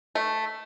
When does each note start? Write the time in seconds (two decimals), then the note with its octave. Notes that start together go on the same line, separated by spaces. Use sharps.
0.15 A3